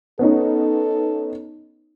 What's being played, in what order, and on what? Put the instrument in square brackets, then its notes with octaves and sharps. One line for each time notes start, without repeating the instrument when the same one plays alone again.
[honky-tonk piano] B3 C#4 D#4 [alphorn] A4